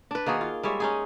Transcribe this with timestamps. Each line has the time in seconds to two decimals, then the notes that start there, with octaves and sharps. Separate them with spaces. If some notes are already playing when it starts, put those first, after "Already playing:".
0.11 D4 B4
0.26 D#3 A#3 F#4 G#4
0.41 F4
0.63 G3 G#3 C#5 E5
0.80 C#4 D#4 G#4